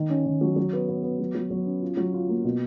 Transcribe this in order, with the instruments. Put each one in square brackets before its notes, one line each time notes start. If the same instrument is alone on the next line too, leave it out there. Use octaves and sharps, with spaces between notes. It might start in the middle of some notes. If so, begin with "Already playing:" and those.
Already playing: [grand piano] D#3
C#4
D#3
F#3
F#3
B3
B3
B3
F#3
F#3
F#3
C#4
F4
F#3
F4
A#3
B2